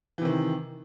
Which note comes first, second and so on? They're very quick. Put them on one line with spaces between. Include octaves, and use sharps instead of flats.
E3 C3 D#3